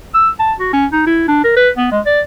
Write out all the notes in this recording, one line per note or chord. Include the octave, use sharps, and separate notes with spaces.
E6
A5
F#4
C#4
D#4
E4
D4
A#4
B4
B3
G#3
D5